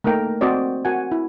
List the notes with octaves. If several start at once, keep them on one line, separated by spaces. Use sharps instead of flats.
A3 A#3 D#4 A#4 G5 A#5
C4 F#4 C5 D5 D#5
F#4 A#4 F#5 G#5
E4